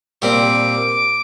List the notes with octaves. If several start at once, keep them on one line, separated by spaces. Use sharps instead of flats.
A#2 G3 C4 D6